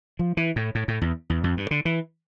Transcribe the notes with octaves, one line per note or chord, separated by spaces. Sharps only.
F3
E3
A2
A2
A2
E2
E2
F2
G2
D3
E3